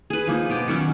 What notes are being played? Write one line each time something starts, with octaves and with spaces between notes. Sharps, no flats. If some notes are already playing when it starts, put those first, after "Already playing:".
G#4 B4
F3 A#3 D#4
B2 G5 D6
D#3 F#3 C#4